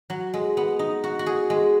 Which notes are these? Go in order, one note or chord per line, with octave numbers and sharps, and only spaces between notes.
F#3
G#3
B3
D#4
F#4
F#4
G#4
G#3